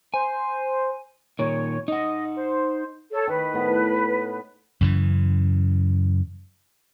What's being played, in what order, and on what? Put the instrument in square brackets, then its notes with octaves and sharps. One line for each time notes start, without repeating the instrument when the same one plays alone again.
[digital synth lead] C5 [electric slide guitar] G#5
[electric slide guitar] A#2 D#3 [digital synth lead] C#5
[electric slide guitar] D#4 F#5 [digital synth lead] D#5
[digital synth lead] C5
[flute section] A4 C#5
[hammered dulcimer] D#3 [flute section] B4
[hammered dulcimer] A2 B3
[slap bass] F#2 C#3 E3